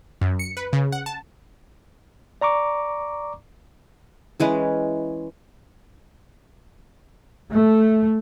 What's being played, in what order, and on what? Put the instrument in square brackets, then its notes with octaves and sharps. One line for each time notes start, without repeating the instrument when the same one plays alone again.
[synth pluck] F#2
C#7
B4
C#3
F#5
A5
[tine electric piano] D5 A#5 C#6 D6
[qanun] E3 G#3 C#4 B4
[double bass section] A3